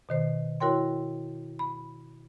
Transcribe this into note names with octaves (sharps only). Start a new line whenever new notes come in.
B2 D#3 C5
E4 F#4 A#4 C#5 G5 C6
B5